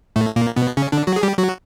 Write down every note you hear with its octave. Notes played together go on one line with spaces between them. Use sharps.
A2 A3
A#2 A#3
B2 B3
C#3 C#4
D3 D4
F#3 F#4
G#4
G3 G4
F#3 F#4